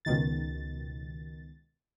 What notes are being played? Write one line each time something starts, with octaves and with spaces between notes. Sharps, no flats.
C#2 B2 D#3 A6